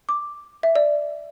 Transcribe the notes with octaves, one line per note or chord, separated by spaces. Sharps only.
D6
E5
D5